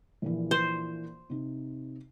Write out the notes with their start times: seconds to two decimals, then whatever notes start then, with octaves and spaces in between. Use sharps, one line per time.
0.22 A#1 A#2 E3
0.51 C5
1.30 C3 D#4